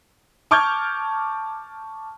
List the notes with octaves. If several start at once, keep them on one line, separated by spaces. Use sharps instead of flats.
A5 C#6 D6 F6 G6 G#6